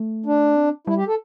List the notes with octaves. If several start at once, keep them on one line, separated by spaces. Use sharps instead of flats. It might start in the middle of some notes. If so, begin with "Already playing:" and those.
Already playing: A3
D4
C4
G3 E4
G4
A4